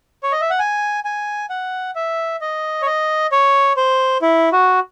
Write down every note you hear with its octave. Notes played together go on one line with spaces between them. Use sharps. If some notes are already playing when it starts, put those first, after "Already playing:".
C#5
D#5
E5
F#5
G#5
G#5
F#5
E5
D#5
C#5
D#5
C#5
C5
E4
F#4